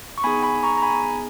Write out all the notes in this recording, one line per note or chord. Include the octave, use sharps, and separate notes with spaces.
C#6
B3 D#4 G#4 G#5 B5
G#5 B5
A#5 C#6
A#5
G#5 B5